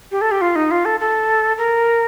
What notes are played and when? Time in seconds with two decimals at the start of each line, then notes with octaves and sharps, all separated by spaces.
0.12 G4
0.21 A4
0.31 G4
0.41 F4
0.56 D#4
0.71 F4
0.85 A4
1.00 A4
1.58 A#4